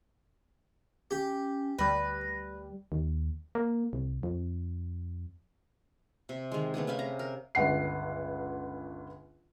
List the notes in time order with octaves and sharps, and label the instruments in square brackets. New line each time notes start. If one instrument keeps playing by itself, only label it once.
[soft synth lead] C#4 [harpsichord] G4
[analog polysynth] D2 G3 [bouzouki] B4 [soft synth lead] A#6
[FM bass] D#2
A#3
C2
F2
[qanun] C3
D#3 G#3
A3 B3 D4 G#4
C3 C#4 F5 B5
A#5
A#4
[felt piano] G1 C#2 F#5 C7